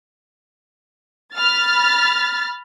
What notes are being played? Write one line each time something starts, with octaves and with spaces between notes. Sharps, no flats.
B5 F6 A6